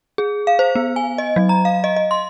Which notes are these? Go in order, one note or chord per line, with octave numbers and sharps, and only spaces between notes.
G#4
F5
C5
B3
G#5
D#5
F#3
A#5
F5
D#5
D#5
C6